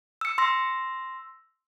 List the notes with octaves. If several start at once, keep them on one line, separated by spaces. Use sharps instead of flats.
E6 C#7
C6 E6 A#6